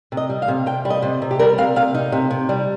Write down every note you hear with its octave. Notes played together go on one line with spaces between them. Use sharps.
C3
D#5
G3
F5
C3
C3 G5
G3
D#5
C3
C3
G4
G3 A#4
C3 F5
C3 F5
D#4
C3
C3
G3